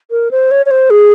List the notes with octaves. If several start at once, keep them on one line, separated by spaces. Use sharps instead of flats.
A#4
C5
C#5
C#5
C5
G#4